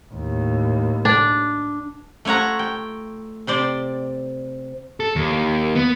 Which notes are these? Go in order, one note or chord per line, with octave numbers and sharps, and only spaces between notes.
D#2 A2
D4
A3 F4 C#5 F#5 A#5
G5
C3 C5 D5
A4
D#2
B3